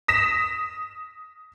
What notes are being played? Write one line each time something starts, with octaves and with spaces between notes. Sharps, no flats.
D#6 A#6 B6 E7